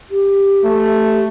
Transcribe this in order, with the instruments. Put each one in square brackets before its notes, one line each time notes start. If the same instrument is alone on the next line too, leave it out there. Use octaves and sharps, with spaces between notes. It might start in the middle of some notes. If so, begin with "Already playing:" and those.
[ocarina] G4
[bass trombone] A3